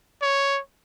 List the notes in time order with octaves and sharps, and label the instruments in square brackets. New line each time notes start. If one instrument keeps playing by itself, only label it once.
[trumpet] C#5